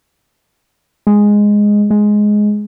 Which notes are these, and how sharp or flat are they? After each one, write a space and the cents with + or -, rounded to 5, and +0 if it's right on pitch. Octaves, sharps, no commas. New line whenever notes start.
G#3 -5
G#3 +5